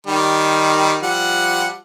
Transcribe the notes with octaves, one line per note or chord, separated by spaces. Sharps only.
D#3 G3
F3 G3 F#5